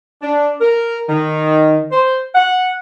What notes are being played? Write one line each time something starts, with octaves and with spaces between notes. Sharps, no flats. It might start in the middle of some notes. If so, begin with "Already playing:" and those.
D4
A#4
D#3
C5
F#5